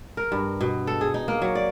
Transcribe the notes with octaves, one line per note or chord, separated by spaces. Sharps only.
A#4
G2
B2
A4
G#4
D#4
A#3
F#3
D5